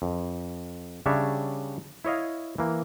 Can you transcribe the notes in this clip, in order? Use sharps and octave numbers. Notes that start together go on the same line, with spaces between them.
F2
C#3 G3 D4 C#5 E5
E4 C#5 D#5 F5
E3 A#3